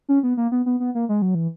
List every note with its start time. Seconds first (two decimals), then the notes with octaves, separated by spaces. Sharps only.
0.09 C#4
0.23 B3
0.37 A#3
0.52 B3
0.66 B3
0.80 B3
0.95 A#3
1.09 G#3
1.22 F#3
1.35 E3